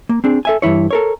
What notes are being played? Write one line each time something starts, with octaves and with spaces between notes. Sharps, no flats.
A#3
C4 D4 G#4
A4 E5 G#5
G2 A#2 E3 E4 C#5
A4 A#4 C#5